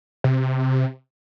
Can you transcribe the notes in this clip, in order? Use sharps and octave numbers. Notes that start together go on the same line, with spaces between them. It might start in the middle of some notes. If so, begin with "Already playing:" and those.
C3